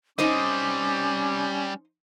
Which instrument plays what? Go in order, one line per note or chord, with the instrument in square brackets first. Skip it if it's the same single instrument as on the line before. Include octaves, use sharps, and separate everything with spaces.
[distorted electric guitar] G3 C4 [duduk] C#4 [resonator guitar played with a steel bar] D#4 C5 D#5 [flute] D6